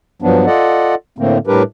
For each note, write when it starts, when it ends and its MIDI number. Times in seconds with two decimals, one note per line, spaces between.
0.22 0.46 43
0.22 0.46 53
0.22 0.46 54
0.22 0.46 59
0.22 0.46 62
0.46 0.95 65
0.46 0.95 69
0.46 0.95 74
0.46 0.95 75
0.46 0.95 78
1.19 1.38 45
1.19 1.38 50
1.19 1.38 57
1.19 1.38 58
1.19 1.38 60
1.47 1.63 45
1.47 1.63 55
1.47 1.63 62
1.47 1.63 67
1.47 1.63 70
1.47 1.63 71